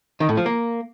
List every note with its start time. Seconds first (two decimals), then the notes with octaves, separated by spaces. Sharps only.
0.20 D#3
0.29 A2
0.37 F3
0.46 A#3